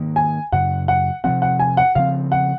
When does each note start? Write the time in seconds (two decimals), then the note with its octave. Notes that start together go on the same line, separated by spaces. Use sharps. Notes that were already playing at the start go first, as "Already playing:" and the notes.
Already playing: G#2 D#3 A#3
0.16 G#5
0.52 F#2 C#3 F#3 F#5
0.88 F#5
1.24 C3 F3 C4 F#5
1.42 F#5
1.59 G#5
1.77 F#5
1.95 C#3 F3 C4 F5
2.32 F#5